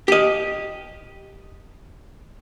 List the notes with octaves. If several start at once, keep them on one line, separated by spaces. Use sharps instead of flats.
G4 D#5